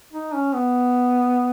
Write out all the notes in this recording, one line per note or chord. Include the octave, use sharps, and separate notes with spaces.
D#4
C#4
B3